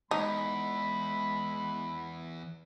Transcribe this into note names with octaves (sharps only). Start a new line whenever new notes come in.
E2 G#3 D#4 B5